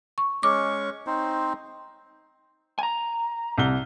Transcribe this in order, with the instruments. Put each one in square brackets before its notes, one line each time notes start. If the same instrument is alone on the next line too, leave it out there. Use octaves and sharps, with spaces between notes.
[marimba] C#6
[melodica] G#3 C#4 C#6 [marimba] D6
[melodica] C4 D#4 C5
[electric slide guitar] G#5 A#5
[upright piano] C2 G7